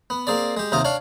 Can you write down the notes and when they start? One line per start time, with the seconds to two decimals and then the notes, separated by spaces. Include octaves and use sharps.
0.10 B3
0.27 A#3 C4 G#4 D5
0.57 G#3 G4
0.72 D#2 C3 D#4 F4 D#5
0.85 D4 C#5 F5